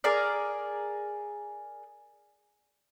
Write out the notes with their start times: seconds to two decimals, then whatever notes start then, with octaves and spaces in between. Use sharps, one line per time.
0.04 G#4 A#4 D5